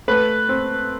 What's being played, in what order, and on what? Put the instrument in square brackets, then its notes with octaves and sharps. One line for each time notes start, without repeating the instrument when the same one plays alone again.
[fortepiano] A3 B4
C4